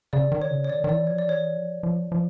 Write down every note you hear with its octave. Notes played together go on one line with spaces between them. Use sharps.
C#3 D5
D#3
C#5
C#3
C#5
D#3 D5
D#3
E3 D5
F3 C#5
D5
E3 C#5
F3
F3
F3